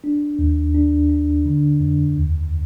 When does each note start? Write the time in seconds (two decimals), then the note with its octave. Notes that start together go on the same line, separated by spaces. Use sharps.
0.04 D4
0.39 D#2
0.75 D4
1.10 D4
1.45 D3
1.80 F2
2.15 D#2